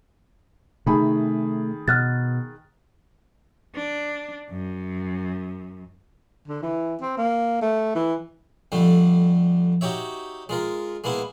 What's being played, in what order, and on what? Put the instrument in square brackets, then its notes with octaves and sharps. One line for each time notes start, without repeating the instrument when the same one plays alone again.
[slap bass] C3 A3 [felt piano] D#3 G#4 B5
[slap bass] B2 [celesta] F6 F#6 A6
[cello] D4
F#2
[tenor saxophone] D3
E3
C4
A#3
A3
E3
[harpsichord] F2 D3 G3 A3
D#4 F#4 G4 C#5 E5
G#3 F4 A#4
G#3 A#3 B3 E4